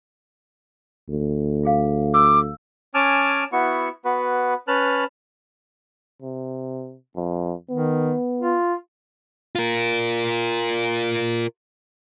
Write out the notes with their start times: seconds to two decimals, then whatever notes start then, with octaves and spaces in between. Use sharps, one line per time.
1.08 D2
1.63 F4 G#4 F5
2.14 D6 E6
2.94 C#4 G#5 A5 D6 E6 F6
3.52 B3 E4 F#4 C#6
4.05 B3 F#4 B4
4.68 C#4 B4 A5 F6 F#6
6.22 C3
7.16 F2
7.70 D#3 B3
8.41 F4
9.55 F4 A#4